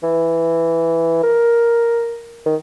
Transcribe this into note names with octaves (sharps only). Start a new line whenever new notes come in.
E3
A#4
D#3